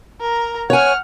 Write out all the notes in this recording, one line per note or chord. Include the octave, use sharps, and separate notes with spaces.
A#4 A#5
C#5 F#5 G#5 F6